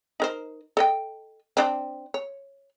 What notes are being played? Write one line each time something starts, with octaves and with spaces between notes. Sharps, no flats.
D#4 A#4 C5
A4 D#5 G5
C4 D4 C5
C#5